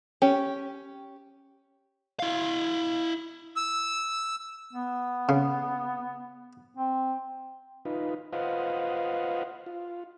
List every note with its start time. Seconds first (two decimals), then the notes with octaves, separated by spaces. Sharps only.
0.22 C#4 G4
2.19 E4 F5
3.56 E6
4.73 B3
5.29 C#3
6.77 C4
7.85 D#4 F4 B4
8.33 F4 B4 C5 D#5 F5 F#5
9.66 F4